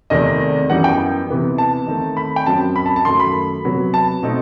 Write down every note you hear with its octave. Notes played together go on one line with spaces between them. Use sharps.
E2 C3 D#3 A3 C4 D#5
F#2 E3 G3 B3 D#4 F#5
G5
C3 E3 B3 D#4
A5
D#3 A3 C4 D#4
B5
G5
F#2 F#3 C4 A5
B5
A5
A5
F#2 D#3 F#3 A3 C6
B5
C3 F#3 B3
A5
B2 A3 C4 D#4